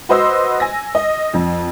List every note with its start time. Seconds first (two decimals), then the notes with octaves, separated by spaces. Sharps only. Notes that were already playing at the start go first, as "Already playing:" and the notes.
0.09 F#4 B4 C5 D#5 C6 E6
0.60 G#5 A#6
0.95 D#5
1.34 F2